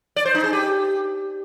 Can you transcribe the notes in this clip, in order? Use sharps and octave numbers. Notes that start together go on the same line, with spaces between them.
D5
C5
D#4
G#4
G4